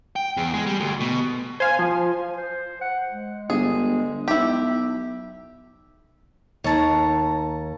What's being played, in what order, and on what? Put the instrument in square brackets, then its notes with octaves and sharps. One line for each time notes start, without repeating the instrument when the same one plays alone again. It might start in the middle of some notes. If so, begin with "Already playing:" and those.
[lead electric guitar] G5
E2
G#3
G3
D2
B2
[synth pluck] C5 F5 [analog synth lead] G#5
[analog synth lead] F3
[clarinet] C5
F#5
G#3
[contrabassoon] G1 [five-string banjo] G#4
[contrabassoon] B1 [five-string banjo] E4 G4
[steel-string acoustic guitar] D#2 [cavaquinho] C#5 A5 A#5